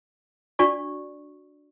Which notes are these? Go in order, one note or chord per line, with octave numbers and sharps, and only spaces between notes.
D4 F#4 D5 C#6